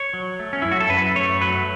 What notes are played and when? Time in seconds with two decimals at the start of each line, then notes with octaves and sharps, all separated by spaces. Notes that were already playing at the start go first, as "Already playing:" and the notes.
Already playing: C#5
0.14 F#3
0.39 A3
0.53 C#4
0.62 F#2 E4
0.72 F#4
0.80 A4
0.90 F#2 B4
1.15 A3 C#5
1.41 F#3 B4